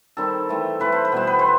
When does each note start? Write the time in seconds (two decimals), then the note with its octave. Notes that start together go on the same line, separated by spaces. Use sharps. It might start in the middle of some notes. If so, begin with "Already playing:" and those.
0.17 D#3 G3 C4 A4
0.49 E3 A3 C4
0.80 E3 A3 C4 B4
0.92 C5
1.05 B4
1.12 B2 G3 B3 C5
1.27 B4
1.39 C5